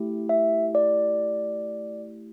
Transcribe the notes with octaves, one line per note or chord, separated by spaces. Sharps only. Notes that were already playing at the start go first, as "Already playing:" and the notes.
Already playing: A3 E4 G4
E5
D5